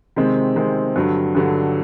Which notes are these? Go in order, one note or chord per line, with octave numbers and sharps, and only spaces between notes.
C3 D#3 G#3 C4
C3 D#3 G#3 C4
G2 D3 F#3
G2 D3 F#3